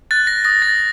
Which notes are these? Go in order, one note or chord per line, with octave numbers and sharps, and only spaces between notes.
F#6 A6
A#6
D#6 A#6
A6